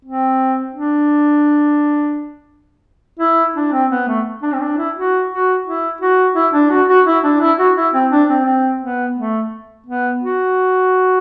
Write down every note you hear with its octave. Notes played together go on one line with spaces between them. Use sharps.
C4
D4
E4
D4
C4
B3
A3
D4
C4
D4
E4
F#4
F#4
E4
F#4
E4
D4
F#4
F#4
E4
D4
E4
F#4
E4
C4
D4
C4
C4
B3
A3
B3
F#4